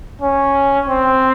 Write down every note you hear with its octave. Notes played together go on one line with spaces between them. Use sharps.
C#4
C4